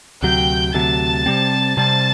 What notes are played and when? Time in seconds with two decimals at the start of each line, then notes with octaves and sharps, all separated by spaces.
0.22 D2 C3 F#3 G5 G6
0.74 D2 C3 F#3 A5 A6
1.26 C3 G3 C4
1.77 C3 G3 C4 A5 A6